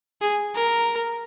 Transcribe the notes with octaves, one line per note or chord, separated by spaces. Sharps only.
G#4
A#4